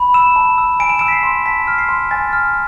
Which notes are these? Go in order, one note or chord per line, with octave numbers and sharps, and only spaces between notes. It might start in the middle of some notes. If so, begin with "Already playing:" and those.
Already playing: B5
E6 E7
A5
E6
G#5 D7
E7
E6 D7
B6
C7
C6
A5 B6
F6
C7
C6
G#5 A6
F6